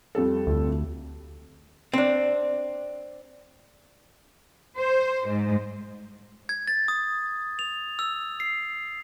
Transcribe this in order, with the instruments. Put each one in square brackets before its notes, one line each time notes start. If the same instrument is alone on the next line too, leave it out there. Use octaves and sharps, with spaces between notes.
[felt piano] F2 G3 A4
[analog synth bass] D2
[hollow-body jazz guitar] C4 D4
[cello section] C5
G#2
[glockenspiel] G#6
A6
D#6
F7
E6
C7